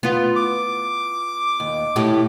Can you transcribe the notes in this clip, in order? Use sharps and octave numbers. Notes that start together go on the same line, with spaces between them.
B3 F4
D6
D#2
A2 E4 G4